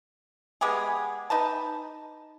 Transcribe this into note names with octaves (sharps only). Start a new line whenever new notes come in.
G#3 B3 G4 G#4
D#4 B4 A5